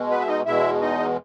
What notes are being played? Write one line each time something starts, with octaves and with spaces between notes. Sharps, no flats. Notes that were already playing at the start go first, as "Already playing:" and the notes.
Already playing: B2 G#3
B3 B4
E5
D#4 D#5
E2 B2 G#3 E4 E5
D#4 D#5